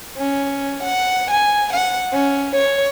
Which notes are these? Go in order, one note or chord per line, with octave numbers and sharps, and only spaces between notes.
C#4
F#5
G#5
F#5
C#4
C#5